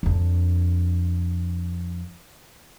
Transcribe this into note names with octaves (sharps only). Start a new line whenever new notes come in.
F2 D4